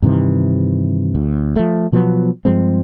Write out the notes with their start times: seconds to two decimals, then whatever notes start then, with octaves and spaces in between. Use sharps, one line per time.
0.02 G2 C3 D#3 E3
1.15 D2
1.56 F3 A3
1.92 B2 F3 F#3 B3
2.45 G2 F3 G#3 C4